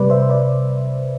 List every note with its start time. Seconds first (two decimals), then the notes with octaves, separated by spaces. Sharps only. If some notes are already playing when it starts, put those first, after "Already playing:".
Already playing: C3 G3 B4 D5
0.10 C5 E5
0.29 B4 D5